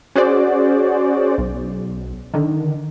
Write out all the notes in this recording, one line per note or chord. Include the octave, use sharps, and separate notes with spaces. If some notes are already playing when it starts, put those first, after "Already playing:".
C#4 F#4 G#4 C5 D5
B1
D3 D#3